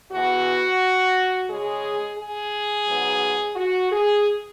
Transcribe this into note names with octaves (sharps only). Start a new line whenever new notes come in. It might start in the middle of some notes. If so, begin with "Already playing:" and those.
E2 E3 B3 F#4
C#3 G#3 C#4 G#4
G#4
G#2 F#3 B3
F#4
G#4